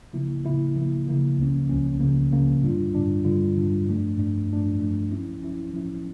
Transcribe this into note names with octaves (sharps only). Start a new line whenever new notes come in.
C#3 F3 A#3 E4
C#3 F3 A#3 E4
C#3 F3 A#3 E4
C#3 F3 A#3 E4
C#2 C#3 F3 A#3 C#4
C#2 C#3 F3 A#3 C#4
C#2 C#3 F3 A#3 C#4
C#2 C#3 F3 A#3 C#4
G2 D3 G3 D4 F4
G2 D3 G3 D4 F4
G2 D3 G3 D4 F4
G2 D3 G3 D4 F4
G2 F3 A3 D4
G2 F3 A3 D4
G2 F3 A3 D4
G2 F3 A3 D4
F3 C#4 E4
F3 C#4 E4
F3 C#4 E4